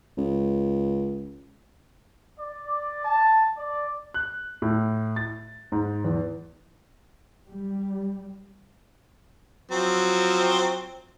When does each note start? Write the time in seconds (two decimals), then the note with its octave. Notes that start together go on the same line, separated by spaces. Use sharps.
0.17 C#2
2.39 D5
3.05 A5
3.58 D5
4.14 F#6
4.62 A2
5.16 A6
5.72 G#2
6.04 E2
7.49 G3
9.71 F3 F#3 C4